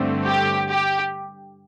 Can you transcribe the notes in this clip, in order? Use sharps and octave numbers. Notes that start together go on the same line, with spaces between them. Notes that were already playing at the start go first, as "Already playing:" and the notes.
Already playing: G2 D3 A3 C4
G4
G4